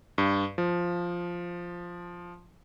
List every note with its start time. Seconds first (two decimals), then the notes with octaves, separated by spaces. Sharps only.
0.18 G2
0.58 F3